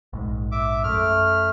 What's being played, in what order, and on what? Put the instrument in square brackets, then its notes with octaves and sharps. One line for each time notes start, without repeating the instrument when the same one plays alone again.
[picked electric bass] A#1 G#2
[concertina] E5 D6
[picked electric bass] F#2 [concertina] A3 F6